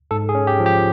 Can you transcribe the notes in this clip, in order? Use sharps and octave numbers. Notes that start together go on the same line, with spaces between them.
G#2 A4
G#4
C#4
G4
F3
G4